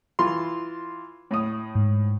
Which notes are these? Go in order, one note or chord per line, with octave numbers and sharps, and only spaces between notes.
E3 F4 C6
A2 D#6
G#2